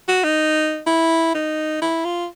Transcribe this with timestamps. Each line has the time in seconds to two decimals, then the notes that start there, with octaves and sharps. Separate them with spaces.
0.08 F#4
0.24 D#4
0.87 E4
1.34 D#4
1.82 E4
2.05 F4